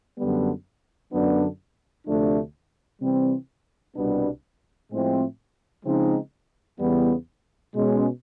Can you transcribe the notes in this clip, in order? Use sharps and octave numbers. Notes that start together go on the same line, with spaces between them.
F#2 D3 G3 B3
F#2 D3 F#3 B3 D4
D2 C3 F3 A3 D4
C3 E3 G3 C4
C2 B2 G3 B3 D4
A2 F3 G#3 C4 E4
C#3 F3 G#3 C4 D#4
E2 C#3 E3 G3 B3
B2 G#3 C#4